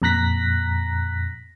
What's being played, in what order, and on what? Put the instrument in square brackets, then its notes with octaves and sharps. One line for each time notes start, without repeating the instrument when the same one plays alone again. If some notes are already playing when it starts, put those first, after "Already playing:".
[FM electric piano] F2 A#2 A#5 F#6 A#6 B6